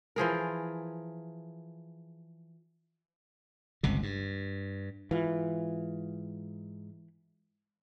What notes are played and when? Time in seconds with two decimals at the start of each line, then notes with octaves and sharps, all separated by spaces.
0.16 E3 F3 G#4 A#4
3.83 G1 C#2 C3
4.03 G2
5.11 G#2 E3 F4